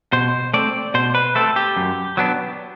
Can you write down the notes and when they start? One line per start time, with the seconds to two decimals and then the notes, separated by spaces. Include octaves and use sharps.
0.13 B2 C5
0.54 A3 C4 D5
0.94 B2 C5
1.15 B4
1.35 A3 C4 A4
1.56 G4
1.76 F#2
2.17 F#3 B3 D4